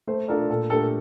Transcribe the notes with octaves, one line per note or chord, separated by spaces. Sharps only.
A3 C5
D4 F4 A4 A#4 D5
A#2 A4
A3 D4 G4 A4 A#4